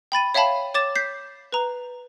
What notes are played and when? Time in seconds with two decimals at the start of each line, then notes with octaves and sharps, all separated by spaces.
0.12 G5 B5 A6 D#7
0.34 C#5 E5 F5 G5 A5 B5
0.74 C#5 D6 A6 E7
0.96 G6 B6 C7
1.52 B4 A#5